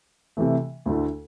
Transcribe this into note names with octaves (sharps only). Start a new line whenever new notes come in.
C3 E3 A3
D2 D3 A3 E4